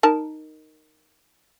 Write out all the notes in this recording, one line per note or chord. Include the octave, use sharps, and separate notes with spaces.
D#4 A#4 A5